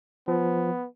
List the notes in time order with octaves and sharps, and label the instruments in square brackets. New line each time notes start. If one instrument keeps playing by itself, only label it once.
[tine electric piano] F3 [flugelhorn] B3